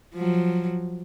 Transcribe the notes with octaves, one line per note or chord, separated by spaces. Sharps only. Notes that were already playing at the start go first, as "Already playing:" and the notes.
F3 F#3